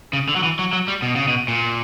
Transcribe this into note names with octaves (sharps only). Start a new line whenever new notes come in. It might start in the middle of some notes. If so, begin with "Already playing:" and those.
C#3
D3
F#3
E3
F#3
F#3
G3
B2
C#3
B2
A#2